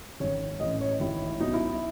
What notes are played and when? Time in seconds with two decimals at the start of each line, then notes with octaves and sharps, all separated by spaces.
0.20 G#1 G#2 D#3 C#5
0.60 A1 A2 E3 D#5
0.81 C#5
1.00 G#1 G#2 D#3 E4
1.41 B1 B2 D#4
1.54 E4